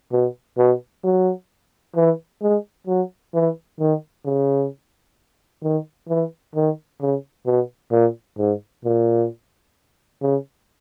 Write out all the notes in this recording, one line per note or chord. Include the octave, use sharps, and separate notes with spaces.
B2
B2
F#3
E3
G#3
F#3
E3
D#3
C#3
D#3
E3
D#3
C#3
B2
A#2
G#2
A#2
C#3